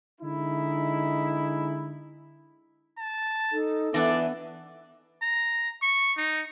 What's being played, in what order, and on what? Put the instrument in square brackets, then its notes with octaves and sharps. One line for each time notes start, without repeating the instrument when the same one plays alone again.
[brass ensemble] D3 G#3 D#4 E4
[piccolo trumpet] A5
[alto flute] D#4 [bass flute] A4
[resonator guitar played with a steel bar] E3 D4 [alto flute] B3 [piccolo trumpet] D5
[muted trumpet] A#5
C#6
D#4